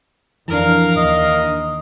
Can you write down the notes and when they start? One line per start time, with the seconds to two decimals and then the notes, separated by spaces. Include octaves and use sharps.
0.48 F2 E3 D4 A#4 F5
0.97 D#2 D#5